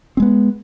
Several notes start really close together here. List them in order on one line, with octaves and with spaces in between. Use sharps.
C4 G#3 B3